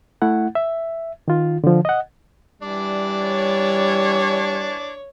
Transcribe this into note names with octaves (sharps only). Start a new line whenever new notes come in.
A3 E4 F#5
E5
D#3 F4
D3 F3
D#5 F#5
E3 G3 D4 D5
C#5